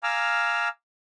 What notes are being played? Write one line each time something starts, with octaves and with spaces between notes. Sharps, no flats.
F5 G#5 A#5 D6 E6 F6